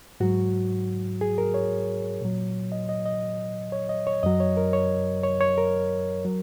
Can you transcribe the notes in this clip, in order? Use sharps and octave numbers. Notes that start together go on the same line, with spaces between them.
G#2 F#3 F#4
G#4
A#4
C#5
A#2 F#3
D#5
D#5
D#5
C#5
D#5
C#5
F#2 F#3 D#5
C#5
A#4
C#5
C#5
C#5
A#4
F#3